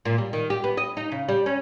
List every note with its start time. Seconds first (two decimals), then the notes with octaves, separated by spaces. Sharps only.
0.05 A#2
0.18 G3
0.33 D#3
0.50 G4
0.64 B3
0.77 D#5
0.97 D#4
1.12 C#3
1.29 G3
1.46 C#4